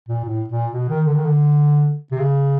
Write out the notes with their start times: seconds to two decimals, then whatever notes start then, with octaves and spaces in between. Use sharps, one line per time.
0.08 A#2
0.24 A2
0.49 A#2
0.73 B2
0.89 D#3
1.06 D3
1.16 D#3
1.25 D3
2.11 C3
2.19 C#3